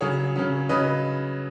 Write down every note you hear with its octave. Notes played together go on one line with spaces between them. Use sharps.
C#3 F#3 C#4 G#4 C#5
C#3 F#3 C#4
C#3 F#3 C#4 B4 D#5